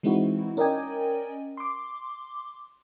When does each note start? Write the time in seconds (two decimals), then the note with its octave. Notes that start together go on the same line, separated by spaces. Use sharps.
0.03 E3 G#3 C4 D#4 E4 F#4
0.57 C#4 A#4 D5 D#5 G5 G#5
1.57 C6 D6